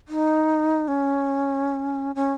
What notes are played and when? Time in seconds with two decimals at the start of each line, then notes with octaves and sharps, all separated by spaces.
0.08 D#4
0.88 C#4
2.15 C#4